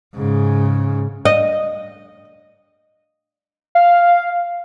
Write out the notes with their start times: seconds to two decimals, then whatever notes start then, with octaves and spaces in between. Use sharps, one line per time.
0.15 G#2 C#3
1.25 D#5
3.75 F5